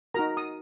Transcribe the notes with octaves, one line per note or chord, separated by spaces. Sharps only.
D#4 F#4 A#4 A#5
D#6